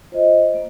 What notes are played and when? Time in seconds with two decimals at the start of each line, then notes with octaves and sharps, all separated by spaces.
0.12 F4 C5 D#5
0.54 A#3